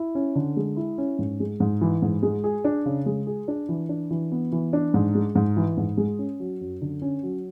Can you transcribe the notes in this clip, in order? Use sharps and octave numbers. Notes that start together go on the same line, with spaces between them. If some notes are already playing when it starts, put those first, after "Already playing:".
Already playing: E4
C#4
D3
G#3
E4
C#4
G#2
G#3
G#2
E3
G#2
G#3
G#4
D4
C#3
G#3
G#4
D4
E3
D4
E3
B3
E3
D4
G#2
G#3
G#2
E3
G#2
G#3
C#4
F#3
F#2
D3
C#4
F#3